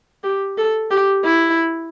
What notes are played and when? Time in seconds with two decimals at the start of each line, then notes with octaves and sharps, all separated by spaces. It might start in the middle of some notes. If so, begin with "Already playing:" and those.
0.24 G4
0.58 A4
0.91 G4
1.24 E4